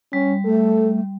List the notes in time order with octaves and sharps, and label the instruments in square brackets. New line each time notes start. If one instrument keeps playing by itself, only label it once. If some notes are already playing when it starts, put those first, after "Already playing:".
[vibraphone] G3 [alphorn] C#4
[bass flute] A3 [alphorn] A4